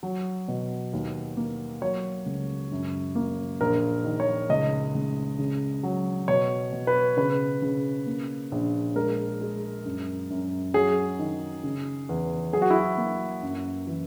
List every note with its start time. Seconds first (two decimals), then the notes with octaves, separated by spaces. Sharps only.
0.03 F#3
0.48 B2
0.93 D#2
1.37 A#3
1.82 F#3 C#5
2.26 C#2
2.72 F#2
3.15 A#3
3.60 A#1 A#4
4.05 D#3
4.20 C#5
4.49 C#2 D#5
4.94 C#2
5.39 C#3
5.83 F#3
6.28 B2 C#5
6.73 B2
6.87 B4
7.17 C#3 B4
7.62 C#3
8.07 A#3
8.52 A#1
8.96 G#3 A#4
9.41 G#3
9.85 F#2
10.30 F#2
10.74 F#3 G#4
11.19 D#3
11.64 C#3
12.09 E2
12.53 F#3 G#4
12.62 F#4
12.70 E4
12.79 F#4
12.98 A#3
13.43 F#2
13.87 E3